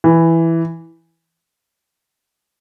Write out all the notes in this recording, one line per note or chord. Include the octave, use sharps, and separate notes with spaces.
E3